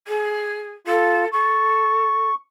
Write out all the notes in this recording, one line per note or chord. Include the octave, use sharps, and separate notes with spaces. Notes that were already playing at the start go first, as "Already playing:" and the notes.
G#4
F4 A4
A4 C#6